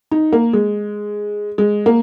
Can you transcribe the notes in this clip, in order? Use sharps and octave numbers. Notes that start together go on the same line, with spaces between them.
D#4
A#3
G#3
G#3
A#3